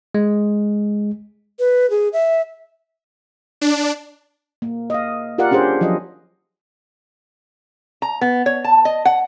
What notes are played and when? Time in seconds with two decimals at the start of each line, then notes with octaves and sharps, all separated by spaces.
0.15 G#3
1.59 B4
1.90 G#4
2.13 E5
3.61 D4
4.62 A#3
4.90 D#5 F5
5.38 F4 G4 A#4 D5 F5 F#5
5.51 C#4 D4 G4 G#4 C5
5.81 F3 F#3 F4 D#5
8.02 A#5
8.21 B3
8.46 C#5
8.64 A5
8.85 D#5
9.05 F#5